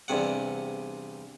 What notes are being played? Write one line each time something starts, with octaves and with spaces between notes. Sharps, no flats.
E2 G2 C3 F#5